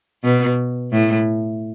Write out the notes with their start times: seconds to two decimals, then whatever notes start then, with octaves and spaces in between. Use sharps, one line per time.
0.24 B2
0.92 A2